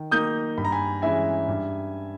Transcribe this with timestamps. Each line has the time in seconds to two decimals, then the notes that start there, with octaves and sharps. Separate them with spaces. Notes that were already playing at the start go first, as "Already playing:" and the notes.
Already playing: D#3
0.11 A#3 D#4 D#6 G6
0.58 G2 B5
0.65 A#5
0.72 G#5 B5
1.02 E3 G#3 C#4 E4 E5 G#5
1.48 G2